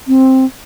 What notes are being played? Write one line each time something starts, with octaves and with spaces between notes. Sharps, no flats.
C4